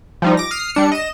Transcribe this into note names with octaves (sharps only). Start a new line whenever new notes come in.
F3 G3 D#4
D6 A#6
D#6 F6 C7
G3 D4 C#7
D#5 E7